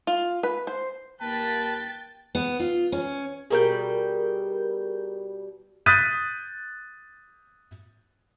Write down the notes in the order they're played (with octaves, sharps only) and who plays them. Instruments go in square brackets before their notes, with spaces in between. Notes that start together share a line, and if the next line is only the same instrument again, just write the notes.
[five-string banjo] F4
B4
C5
[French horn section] D#2 A#3 [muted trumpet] B4 [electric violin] G5 A6 [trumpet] A5
[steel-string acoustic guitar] B3
F4
C#4
[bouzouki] B2 G3 G5 [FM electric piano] G#4 A#4 G6
[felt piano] D#6 F#6 G6 A6 B6 D#7